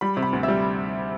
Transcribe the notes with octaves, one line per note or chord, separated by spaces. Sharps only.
G3 B5
C3
B5
D2
E5
G3